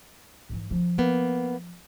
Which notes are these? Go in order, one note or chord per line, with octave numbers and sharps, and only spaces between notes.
G#2 E3
F3 D4
A#3 B3